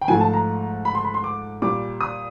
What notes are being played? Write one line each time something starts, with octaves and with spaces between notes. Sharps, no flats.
G5
G#2 F3 A3 G#5
A5
A#5
B5
C6
B5
C6
D6
A#2 G3 D6
D#6